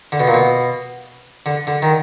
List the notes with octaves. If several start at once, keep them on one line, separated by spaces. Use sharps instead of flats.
D3
B2
A#2
B2
D3
D3
D#3